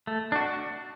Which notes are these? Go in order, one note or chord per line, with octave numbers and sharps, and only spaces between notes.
A3
D4 F#4